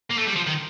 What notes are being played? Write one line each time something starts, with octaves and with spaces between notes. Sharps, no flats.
A#3
A3
G3
F3
D#3